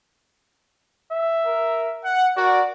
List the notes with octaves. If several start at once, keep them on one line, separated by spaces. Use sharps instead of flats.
E5
A#4
F#5
F#4 A#4 D5